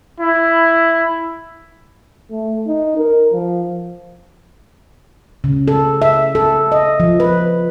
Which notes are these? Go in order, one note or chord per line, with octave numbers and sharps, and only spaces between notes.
E4
A3
D#4
A#4
F3
C#3
A4
E5
A4
D#5
F3
B4